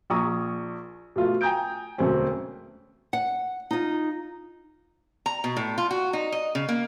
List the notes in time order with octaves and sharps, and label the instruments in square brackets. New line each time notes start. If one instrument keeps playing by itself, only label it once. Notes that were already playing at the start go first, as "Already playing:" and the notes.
[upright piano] A#1 A#5 C#6 D#6
B2 A3 F4
G5 G#5 A#5 D#6 G6 D7
E1 D2 B2 C4 C#4
[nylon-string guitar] F#5
D#4 F4
[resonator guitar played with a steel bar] A#5
B2
A2
F4
F#4
D#4
D#5
C#3
A#3